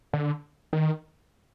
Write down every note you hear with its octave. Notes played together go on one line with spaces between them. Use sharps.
D3
D#3